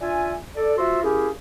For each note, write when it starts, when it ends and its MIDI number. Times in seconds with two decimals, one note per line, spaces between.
0.01 0.35 62
0.01 0.35 65
0.01 0.35 76
0.01 0.35 80
0.57 0.73 69
0.57 0.73 74
0.77 0.99 53
0.77 0.99 65
0.77 0.99 66
0.77 0.99 76
0.77 0.99 84
0.77 0.99 88
1.03 1.28 58
1.03 1.28 61
1.03 1.28 64
1.03 1.28 67
1.03 1.28 68